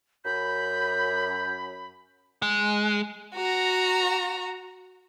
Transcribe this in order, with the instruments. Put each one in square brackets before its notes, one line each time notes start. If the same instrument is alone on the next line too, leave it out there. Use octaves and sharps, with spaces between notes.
[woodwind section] F#2 B5 [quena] G6
[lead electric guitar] G#3
[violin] F#4 A#5